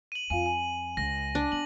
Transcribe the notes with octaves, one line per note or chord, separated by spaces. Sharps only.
D#7 F#7
F2 F4 F5 G#5 D#7
G#5
C#2 A#6
D4
B3 F#7